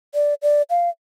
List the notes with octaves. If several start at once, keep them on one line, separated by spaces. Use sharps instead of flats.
D5
D5
F5